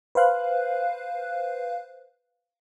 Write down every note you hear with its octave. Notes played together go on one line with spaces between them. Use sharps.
B4 C5 F5 F#6